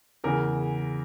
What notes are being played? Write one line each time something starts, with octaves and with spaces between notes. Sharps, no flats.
E2 C#3 E3 A#4